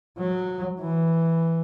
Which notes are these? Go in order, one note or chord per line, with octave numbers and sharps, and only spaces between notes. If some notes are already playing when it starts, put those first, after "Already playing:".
F#3
E3